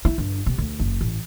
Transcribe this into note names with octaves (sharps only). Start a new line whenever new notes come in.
E4
G1
C3
D2
F#1
A1